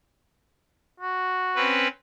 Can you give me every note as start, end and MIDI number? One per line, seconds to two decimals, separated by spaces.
1.00 1.81 66
1.56 1.88 60
1.56 1.88 61
1.56 1.88 71